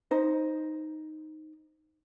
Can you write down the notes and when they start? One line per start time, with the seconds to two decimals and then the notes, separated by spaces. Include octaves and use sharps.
0.11 D#4 C5 D#5